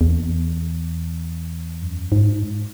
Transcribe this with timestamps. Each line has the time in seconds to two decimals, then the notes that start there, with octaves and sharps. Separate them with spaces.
0.01 E2
1.82 F#2
2.12 G#2